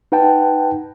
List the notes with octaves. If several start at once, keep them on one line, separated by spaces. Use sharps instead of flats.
D#4 B4 F#5 G5 A5